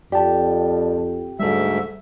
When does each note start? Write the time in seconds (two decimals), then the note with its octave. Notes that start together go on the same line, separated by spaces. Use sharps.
0.12 F2 G4 D5 A5
1.40 D2 G#2 G3 A4 E5